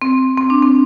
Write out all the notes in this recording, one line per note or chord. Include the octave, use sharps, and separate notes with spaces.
C4
C4
D4
C4